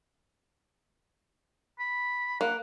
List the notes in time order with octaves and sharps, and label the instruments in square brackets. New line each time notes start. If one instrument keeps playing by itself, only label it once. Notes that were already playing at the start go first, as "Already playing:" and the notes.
[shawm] B5
[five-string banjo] A#3 [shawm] F#5